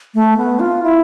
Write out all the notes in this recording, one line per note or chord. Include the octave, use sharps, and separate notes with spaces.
A3
B3
F4
E4